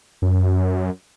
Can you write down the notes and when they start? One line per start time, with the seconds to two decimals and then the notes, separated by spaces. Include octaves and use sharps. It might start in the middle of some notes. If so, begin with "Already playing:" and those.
0.22 F#2